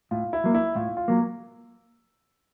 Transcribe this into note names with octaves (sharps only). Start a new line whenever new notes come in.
A2 F4
E4
F#3 A#3
E4
A2 F4
F4
F#3 A#3